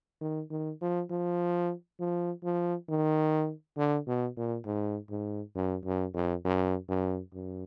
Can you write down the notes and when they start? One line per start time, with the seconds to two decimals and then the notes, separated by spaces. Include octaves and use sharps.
0.21 D#3
0.50 D#3
0.81 F3
1.10 F3
2.00 F3
2.44 F3
2.89 D#3
3.77 D3
4.07 B2
4.37 A#2
4.66 G#2
5.10 G#2
5.55 F#2
5.85 F#2
6.14 F2
6.45 F#2
6.89 F#2
7.34 F#2